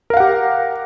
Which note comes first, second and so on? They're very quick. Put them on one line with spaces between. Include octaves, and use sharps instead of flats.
A#4 F5 F#5 G4